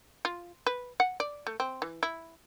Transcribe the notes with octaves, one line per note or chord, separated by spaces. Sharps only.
F4
B4
F#5
D5
A3
C4
E3
E4